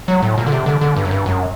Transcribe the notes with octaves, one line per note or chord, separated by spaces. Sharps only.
F#3
A2
A#2
D3
C3
D3
D3
G2
F#2
G2
F#2